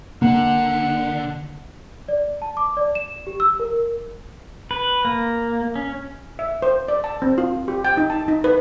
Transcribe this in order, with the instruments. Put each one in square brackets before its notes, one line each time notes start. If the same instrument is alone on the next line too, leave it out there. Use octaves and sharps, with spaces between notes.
[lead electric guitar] D3 [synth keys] A#3 [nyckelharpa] F#5
[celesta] D5
A5
D6
D5
E7
G4
E6
A#4
[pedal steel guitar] B4
A#3
C#4
[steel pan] E5
C5
D5
A5
C4
F4
G4
G5
D#4
A5
D#4
B4